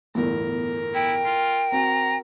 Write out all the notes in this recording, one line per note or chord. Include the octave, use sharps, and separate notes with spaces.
G1 E2 A2 A#4
E4 G5
F4
C4 F#4 A#5